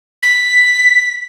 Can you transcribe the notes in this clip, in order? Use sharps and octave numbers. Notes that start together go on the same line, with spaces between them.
B6